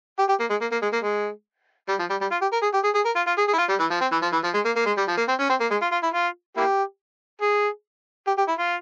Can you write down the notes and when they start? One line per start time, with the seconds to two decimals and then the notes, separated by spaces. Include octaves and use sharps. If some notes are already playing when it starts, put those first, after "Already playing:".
0.19 G4
0.29 G4
0.40 A#3
0.50 G#3
0.61 A#3
0.72 A#3
0.83 G#3
0.93 A#3
1.04 G#3
1.89 G3
1.99 F3
2.10 G3
2.21 G3
2.32 F4
2.42 G4
2.53 A#4
2.63 G#4
2.74 G4
2.84 G#4
2.95 G#4
3.06 A#4
3.16 F4
3.27 F4
3.38 G#4
3.48 G#4
3.53 E4
3.59 F4
3.70 G3
3.80 E3
3.91 F3
4.01 C4
4.12 E3
4.22 F3
4.33 E3
4.44 F3
4.54 G#3
4.65 A#3
4.76 A#3
4.86 G#3
4.98 G3
5.08 F3
5.18 A#3
5.29 C4
5.40 C#4
5.50 C4
5.61 A#3
5.71 G#3
5.82 F4
5.92 F4
6.03 E4
6.14 F4
6.57 A#3 E4 G4
7.42 G#4
8.27 G4
8.38 G4
8.48 E4
8.59 F4